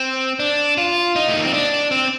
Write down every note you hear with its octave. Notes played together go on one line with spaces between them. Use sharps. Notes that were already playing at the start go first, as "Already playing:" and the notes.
Already playing: C4
D4
F4
D#4
A3
A#3
C4
D4
C4